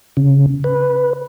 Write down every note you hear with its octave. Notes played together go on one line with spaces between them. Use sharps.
C#3
B4